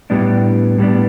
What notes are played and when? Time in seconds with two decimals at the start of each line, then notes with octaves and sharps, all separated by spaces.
0.10 A2 G3 B3 D4
0.78 A2 G3 B3 D4